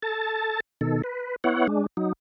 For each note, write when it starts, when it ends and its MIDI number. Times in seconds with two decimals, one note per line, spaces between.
0.02 0.60 69
0.02 0.60 81
0.81 1.02 47
0.81 1.02 51
0.81 1.02 69
1.04 1.36 71
1.44 1.67 59
1.44 1.67 64
1.44 1.67 73
1.44 1.67 78
1.67 1.86 56
1.67 1.86 62
1.97 2.13 54
1.97 2.13 63